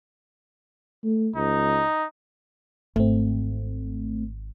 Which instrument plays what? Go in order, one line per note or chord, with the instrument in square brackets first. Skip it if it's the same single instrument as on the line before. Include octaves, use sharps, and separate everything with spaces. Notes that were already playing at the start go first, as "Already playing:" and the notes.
[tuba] A3
[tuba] C#2 [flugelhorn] D#4
[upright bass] G#1 [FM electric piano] A3 C4